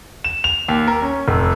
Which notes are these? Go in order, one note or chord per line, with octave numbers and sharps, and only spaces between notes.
E7
F7
D#2
A#4
C#4
F1